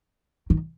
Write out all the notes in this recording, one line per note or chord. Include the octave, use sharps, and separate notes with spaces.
D#3